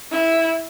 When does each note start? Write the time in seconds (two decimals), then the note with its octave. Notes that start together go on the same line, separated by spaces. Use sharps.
0.11 E4